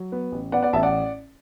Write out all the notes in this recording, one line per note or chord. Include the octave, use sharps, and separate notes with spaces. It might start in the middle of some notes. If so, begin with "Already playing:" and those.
Already playing: F#3
B3
A1
B3 D5 F#5
D5 F#5
A1 E5 A5
D5 F#5